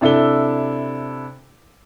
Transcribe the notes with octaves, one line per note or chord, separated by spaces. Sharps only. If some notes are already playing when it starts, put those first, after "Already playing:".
C3 D4 E4 A4 G7